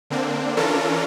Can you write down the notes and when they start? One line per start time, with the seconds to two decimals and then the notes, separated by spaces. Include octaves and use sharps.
0.10 D3 A#3 C4 D4
0.57 E3 C#4 D4 F4 A4 A#4